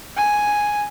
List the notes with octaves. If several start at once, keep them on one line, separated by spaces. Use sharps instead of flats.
G#5